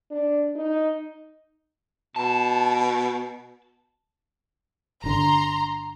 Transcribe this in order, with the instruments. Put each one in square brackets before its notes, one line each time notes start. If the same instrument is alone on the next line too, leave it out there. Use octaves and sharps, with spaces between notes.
[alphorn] D4
D#4
[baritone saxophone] B2 [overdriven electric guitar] A5
[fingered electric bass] G1 D3 [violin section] A#5 C6